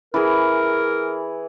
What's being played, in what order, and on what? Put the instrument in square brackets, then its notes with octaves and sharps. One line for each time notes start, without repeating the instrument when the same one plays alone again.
[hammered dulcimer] E3 G#4 [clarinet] A#4